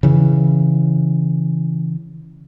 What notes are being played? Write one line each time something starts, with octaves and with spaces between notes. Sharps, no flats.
C#3 E3